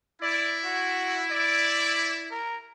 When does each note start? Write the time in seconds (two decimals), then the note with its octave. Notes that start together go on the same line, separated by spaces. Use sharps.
0.22 E4 D5
0.64 F#4
1.30 D5
2.31 A#4